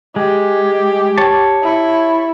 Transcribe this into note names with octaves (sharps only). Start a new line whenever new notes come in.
G#3 G4
C#5 A5
E4